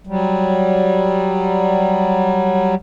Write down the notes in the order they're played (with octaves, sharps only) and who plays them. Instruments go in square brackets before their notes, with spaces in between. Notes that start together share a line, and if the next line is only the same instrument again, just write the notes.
[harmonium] F#3 G3